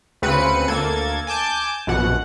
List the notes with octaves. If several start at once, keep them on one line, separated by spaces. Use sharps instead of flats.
D2 C#3 C4 B4 C#7 D#7
D2 A#3 A4 G#6 A6
G#5 A5 D6 G6
A#1 F#2 B2 F#5